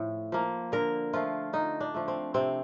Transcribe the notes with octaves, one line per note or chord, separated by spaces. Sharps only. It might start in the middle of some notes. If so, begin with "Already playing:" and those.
Already playing: A2 F3
F3 A#3
D3 A#4
F3 A3 F4
D3 D#4
D4
F3 A3
C4
C3 C4